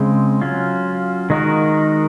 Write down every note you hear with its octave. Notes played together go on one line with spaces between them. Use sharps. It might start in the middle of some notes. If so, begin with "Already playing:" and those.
Already playing: C#3 G#3 C4
F#3 C#4 F4
D#3 G#3 D#4 F#4 A#4